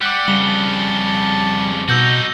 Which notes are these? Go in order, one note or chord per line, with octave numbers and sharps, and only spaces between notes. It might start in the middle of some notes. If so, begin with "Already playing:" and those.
G3 F#5 D6 C#7
F2 C#3 G3 G7
A5
B2 D#4 F#4 E6 G6 A#6